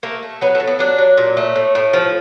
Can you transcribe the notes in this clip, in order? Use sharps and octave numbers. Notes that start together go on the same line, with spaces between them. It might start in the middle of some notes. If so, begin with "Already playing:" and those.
A3 A#3
A3
F#3 B3
A3
A2
B3
F#3 D4
F#3
A#2
A3
A2
A2
F3